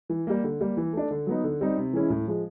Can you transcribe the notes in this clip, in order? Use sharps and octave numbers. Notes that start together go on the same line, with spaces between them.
E3
G3 A#3
D3
G3 A#3
E3
A3 D4
D3
F#3 B3 D#4
D3
G3 C4 D#4
C3
E3 G#3 C#4 E4
A2
F3 G#3